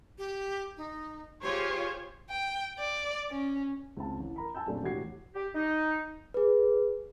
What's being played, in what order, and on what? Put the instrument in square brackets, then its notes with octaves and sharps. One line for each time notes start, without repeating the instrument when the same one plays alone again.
[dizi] G4
D#4
[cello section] F4 G#4 C5 [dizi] G4 [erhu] C#5
[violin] G5
D5
C#4
[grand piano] C#2 C4 A5
A1
A#4 A#5 B5
G#5 A5 E6 G6
F#2 A#2 A3 C4 D4
E1 A2 F#4 G4 G#6 C7
[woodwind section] G4
D#4
[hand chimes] G#4 B4